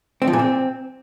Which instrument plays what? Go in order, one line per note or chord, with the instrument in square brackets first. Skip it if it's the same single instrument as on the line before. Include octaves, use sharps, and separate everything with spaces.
[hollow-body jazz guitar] C4
F3
A#2
C4